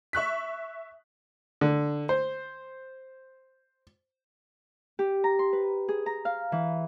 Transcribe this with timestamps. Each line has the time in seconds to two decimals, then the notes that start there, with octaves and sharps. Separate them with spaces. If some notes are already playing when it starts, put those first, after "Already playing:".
0.13 E5 C#6 F#6 B6
1.61 D3
2.09 C5
4.99 G4
5.24 A#5
5.39 C6
5.53 B4
5.88 G#4
6.06 A#5
6.25 F5
6.52 E3